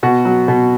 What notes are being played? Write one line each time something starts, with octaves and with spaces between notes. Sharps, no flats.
B2 F#4
F#3
B2